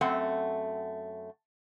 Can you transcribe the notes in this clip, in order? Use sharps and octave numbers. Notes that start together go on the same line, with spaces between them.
F#2 A3 C4 F#5